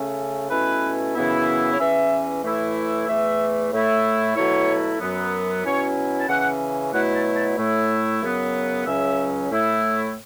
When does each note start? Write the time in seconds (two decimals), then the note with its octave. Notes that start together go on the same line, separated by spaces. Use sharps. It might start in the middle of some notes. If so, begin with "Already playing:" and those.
Already playing: C#3 A3 C#4
0.50 B2 A3 C#4 E4 B4
1.14 F#2 C#3 E3 B3 E4
1.72 C#5
1.79 E2 E3 C#4 E5
2.43 A2 E3 A3 E4
3.07 E2 E3 A3 E5
3.72 A2 A3 E4
4.35 B2 F#3 A3 E4 C#5
5.00 F#2 F#3 B3
5.64 B2 F#3 C#4 E4 C#5
6.18 A5
6.28 C#3 E3 C#4 F#5
6.93 B2 F#3 A3 E4 F#5
7.15 A5
7.36 A5
7.57 A2 A3 E4
8.22 F#2 C#3 F#3 B3
8.85 C#2 C#3 F#3 C#4 E5
9.50 A2 A3 E4